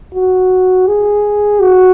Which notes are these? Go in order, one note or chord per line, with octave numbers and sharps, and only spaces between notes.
F#4
G#4
F#4